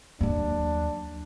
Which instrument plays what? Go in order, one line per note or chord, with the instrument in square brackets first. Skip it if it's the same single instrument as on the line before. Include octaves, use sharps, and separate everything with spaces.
[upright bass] D#2 F#3 [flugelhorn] D4